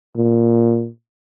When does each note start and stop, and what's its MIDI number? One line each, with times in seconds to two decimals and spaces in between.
0.16 0.88 46